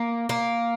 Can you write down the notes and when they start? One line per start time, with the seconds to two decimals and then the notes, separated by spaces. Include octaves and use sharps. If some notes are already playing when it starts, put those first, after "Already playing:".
Already playing: A#3
0.29 A#3